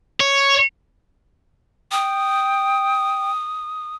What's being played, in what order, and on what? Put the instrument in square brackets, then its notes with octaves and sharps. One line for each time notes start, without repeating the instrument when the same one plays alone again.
[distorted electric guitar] C#5
[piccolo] G5 [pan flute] D#6